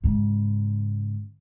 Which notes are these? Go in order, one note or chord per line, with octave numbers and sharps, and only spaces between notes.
G#2 C#3